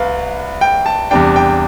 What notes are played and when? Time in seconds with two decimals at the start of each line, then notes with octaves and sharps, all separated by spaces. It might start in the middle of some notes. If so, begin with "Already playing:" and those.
Already playing: C2 B4 F5
0.61 G5
0.86 A5
1.11 E2 C3 G3 D4 G5
1.36 G5